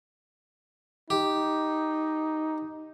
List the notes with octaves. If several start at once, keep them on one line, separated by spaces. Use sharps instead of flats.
D#4 G4